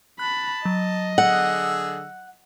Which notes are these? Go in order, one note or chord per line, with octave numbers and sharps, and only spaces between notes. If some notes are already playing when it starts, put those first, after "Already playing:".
A5 B5 F#6
F#3 D#5
D3 G#4 F#5 E6